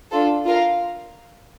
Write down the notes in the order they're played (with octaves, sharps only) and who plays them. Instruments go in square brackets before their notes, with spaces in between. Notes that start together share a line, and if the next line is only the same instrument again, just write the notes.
[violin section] D4 F4 A4
F4 A#4 F5